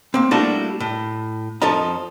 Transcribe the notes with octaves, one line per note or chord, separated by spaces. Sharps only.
A#3 C4
G3 A3 A#3 D4 E4 F#4
A2
F2 F3 A4 D#5 A#5